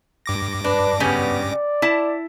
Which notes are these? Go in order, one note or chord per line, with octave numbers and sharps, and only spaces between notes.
G2 D6 A#6
D4 B4
C#3 G3 B3 C#4
D5
E4 A5